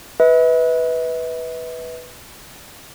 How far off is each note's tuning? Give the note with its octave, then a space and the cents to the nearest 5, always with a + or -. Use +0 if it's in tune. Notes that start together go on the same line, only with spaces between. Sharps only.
B4 +0 E5 -45